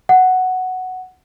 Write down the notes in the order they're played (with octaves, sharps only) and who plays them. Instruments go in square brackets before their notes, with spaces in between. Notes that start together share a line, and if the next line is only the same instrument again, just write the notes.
[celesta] F#5